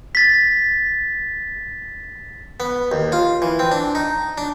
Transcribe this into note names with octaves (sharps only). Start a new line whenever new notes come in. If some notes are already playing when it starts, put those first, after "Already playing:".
A6 B6
B3
D#2
F4
E3
C4
D4
D#4
D4